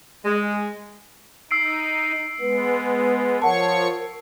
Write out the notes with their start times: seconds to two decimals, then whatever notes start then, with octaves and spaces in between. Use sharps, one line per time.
0.24 G#3
1.51 D#4 E6 C7 D7
2.40 G#3 B3 B4
3.42 F3 A#4 C#5 F#5 A5 C#6